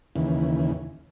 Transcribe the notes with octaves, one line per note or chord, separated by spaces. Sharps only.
D#2 C#3 E3